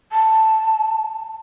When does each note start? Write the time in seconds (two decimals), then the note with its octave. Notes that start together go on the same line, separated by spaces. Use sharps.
0.12 A5